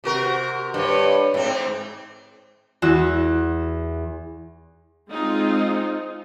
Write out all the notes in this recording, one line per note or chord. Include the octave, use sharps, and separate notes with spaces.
C3 F#4 A#4
G2 C#5
G#2 C4
E2 F#4 E6
G#3 C4 D#4 F4